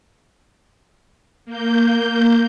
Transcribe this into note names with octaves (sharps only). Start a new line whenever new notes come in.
A#3 G6